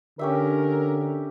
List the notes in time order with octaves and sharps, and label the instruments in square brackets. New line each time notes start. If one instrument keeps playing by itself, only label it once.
[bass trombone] D3 [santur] C#4 G4 E5 [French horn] A#4